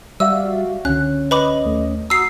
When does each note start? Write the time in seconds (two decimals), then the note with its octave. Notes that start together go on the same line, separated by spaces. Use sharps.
0.20 G3 F#4 D5 E5 F5 E6
0.85 C#2 D3 C#4 F#6
1.31 B4 D#5 B5 D6
1.65 D#2 A3
2.10 F#4 A#5 D#6 E6 C7